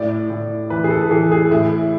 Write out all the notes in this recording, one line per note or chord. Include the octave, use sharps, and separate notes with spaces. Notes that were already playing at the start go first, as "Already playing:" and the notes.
Already playing: A2 D5
A2
E3 B4
G#4
A4
E3 G#4
G#4
A2 E4